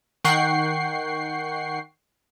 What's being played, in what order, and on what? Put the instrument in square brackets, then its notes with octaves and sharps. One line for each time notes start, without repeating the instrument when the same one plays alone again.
[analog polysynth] D#3 F#5 G5 C#6 C7